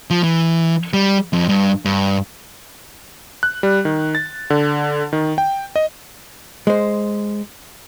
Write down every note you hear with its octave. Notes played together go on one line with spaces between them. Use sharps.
F3
E3
G3
F2
G2
G2
F#6
G3
D#3
A6
D3
D#3
G5
D#5
G#3 C5